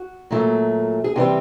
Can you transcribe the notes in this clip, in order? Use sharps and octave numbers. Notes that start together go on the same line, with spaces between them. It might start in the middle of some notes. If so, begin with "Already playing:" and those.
Already playing: F#4
A#2 F#3 A3
G#4
C3 E3 G3 C4 G4